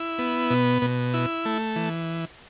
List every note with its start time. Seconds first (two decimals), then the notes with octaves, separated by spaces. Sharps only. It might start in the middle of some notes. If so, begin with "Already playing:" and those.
Already playing: E4
0.19 B3
0.50 B2
0.82 B2
1.14 E4
1.45 A3
1.76 E3